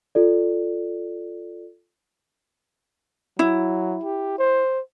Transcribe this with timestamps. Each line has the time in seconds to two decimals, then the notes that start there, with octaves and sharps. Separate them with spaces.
0.15 F4 A4 D5
3.39 F#3 E4
4.04 G4
4.39 C5